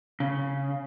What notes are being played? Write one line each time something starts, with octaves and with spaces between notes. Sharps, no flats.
C#3